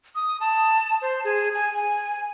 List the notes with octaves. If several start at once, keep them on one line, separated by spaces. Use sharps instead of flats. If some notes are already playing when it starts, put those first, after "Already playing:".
D#6
A5
C5
G#4
G#5
G#5